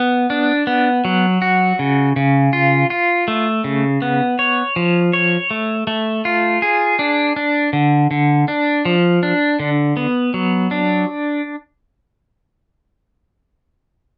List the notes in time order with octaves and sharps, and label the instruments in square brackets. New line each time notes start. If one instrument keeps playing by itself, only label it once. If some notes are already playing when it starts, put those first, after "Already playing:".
Already playing: [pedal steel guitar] B3
D4
B3
F#3
F#4
C#3
C#3
F4
F4
A3
C#3
B3
C#5
F3
C#5
A3
A3
F4
G#4
D4
D4
D3
D3
D4
F3
D4
D3
B3
F#3
D4